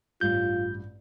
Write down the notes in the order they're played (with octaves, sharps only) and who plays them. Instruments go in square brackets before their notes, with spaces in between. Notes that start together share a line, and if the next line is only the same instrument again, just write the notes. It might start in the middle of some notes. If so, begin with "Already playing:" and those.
[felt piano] A1 G2 [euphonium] F4 [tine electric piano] G6